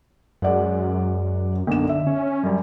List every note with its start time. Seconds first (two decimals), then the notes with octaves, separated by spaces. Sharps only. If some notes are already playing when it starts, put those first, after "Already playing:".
0.42 F#2 G#3 D5 F#5
1.67 B1 D3 A#3 E7
1.89 E5
2.07 C#4
2.43 F#2 G3